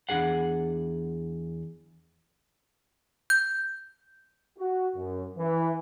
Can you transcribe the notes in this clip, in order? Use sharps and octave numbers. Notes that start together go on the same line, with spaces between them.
E2 G2 D4 G#4 F#5
G6
F#4
F#2
E3